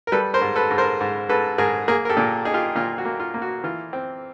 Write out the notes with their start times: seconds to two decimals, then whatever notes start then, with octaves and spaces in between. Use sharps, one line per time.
0.07 A#4
0.12 G3 A4 B4
0.34 A#4 C5
0.41 G#2
0.56 A4 B4
0.71 G#2
0.78 A#4 C5
1.00 G#2
1.29 G#2 A4 B4
1.58 G#2 G#4 A#4
1.88 A#3 G#4 A#4
2.05 A#4
2.09 G4 A4
2.17 A#2
2.45 D#4 G#4
2.54 F4 G4
2.75 A#2 F4
2.98 F#4
3.05 A#3
3.20 F4
3.34 A#3
3.42 F#4
3.64 E3 F4
3.93 C4